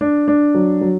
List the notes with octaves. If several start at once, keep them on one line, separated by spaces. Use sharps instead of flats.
D4
D4
F#3
F#3